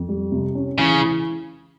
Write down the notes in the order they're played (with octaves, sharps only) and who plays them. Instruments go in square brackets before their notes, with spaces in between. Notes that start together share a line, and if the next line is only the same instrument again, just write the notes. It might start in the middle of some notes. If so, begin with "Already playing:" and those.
Already playing: [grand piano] F2
G3
C3
C#4
[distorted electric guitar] C#3 [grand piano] E3
[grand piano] E3